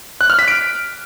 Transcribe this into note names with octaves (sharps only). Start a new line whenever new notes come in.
F#6
F6
B6
D7